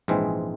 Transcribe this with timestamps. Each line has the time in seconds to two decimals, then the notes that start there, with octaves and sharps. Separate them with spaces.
0.08 A#1 G#2 E3 G#3 C4